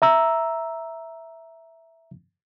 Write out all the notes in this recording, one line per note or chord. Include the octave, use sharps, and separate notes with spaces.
E5 A#5 E6